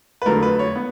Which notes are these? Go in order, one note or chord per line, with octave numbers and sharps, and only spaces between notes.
B4
F2 D3 F#3 A3 A#4
B4
C#5
B3